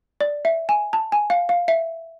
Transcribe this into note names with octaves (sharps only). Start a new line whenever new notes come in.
D5
E5
G#5
A5
G#5
F5
F5
E5